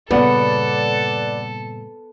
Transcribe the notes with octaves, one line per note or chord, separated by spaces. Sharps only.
G2 A#2 C#3 B3 A4 B4 D5 F#5